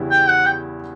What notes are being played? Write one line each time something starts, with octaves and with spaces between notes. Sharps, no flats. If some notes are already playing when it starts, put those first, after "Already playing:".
Already playing: E2 C#3 G3 B3 E4
G5
F#5
G5